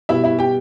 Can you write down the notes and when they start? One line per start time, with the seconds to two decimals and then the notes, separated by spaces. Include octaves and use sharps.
0.09 B2 G3 E4 E5
0.24 E4 E5
0.39 G4 G5